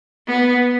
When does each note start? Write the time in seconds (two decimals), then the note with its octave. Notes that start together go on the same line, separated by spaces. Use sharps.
0.28 B3